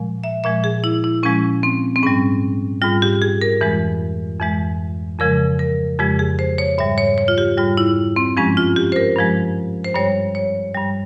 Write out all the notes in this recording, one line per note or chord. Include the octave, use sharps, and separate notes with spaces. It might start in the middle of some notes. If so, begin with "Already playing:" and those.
Already playing: A#2 F3 G#3
E5
A#2 F3 G#3 E5
G#4
E4
E4
A#2 F3 G#3 C#4
C4
C4
G#2 G3 C#4
G#2 G3 F4
G4
G#4
A#4
F2 E3 G#3
F2 E3 G#3
F2 C#3 F3 G#3 A#4
A#4
F2 C#3 F3 G#3 G4
G#4
C5
C#5
G#2 G3 E5
C#5
C#5
F4
G4
G#2 G3 F4
E4
C4
G2 F3 G#3 C#4
F4
G4
C5
A#4
G2 F3 G#3
C5
G2 G3 C#5
C#5
G2 G3